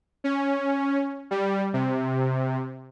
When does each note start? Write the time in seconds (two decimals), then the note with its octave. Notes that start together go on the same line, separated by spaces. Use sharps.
0.24 C#4
1.31 G3
1.73 C3